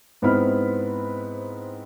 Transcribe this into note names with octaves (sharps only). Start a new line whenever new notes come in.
G#2 B3 C4 E4 B5 F6